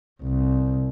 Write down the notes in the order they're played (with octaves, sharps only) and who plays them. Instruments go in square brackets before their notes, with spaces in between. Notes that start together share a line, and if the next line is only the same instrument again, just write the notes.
[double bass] C2